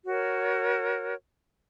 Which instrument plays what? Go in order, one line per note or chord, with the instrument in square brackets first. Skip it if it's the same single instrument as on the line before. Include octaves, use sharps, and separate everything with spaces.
[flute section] F#4 A#4 C#5